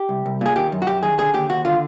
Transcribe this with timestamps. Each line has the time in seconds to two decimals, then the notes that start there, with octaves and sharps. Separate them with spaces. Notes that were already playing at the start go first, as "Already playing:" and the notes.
Already playing: G4
0.09 C2
0.26 C2
0.41 A#2 G#4
0.56 D#3 G4
0.72 F#2
0.82 F#4
0.87 F#2 G4
1.03 D#3 G#4
1.18 D3 G#4
1.34 D#2 G4
1.50 D#2 F#4
1.65 D3 F4